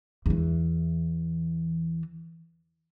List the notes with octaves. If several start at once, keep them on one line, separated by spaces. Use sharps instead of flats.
E2 E3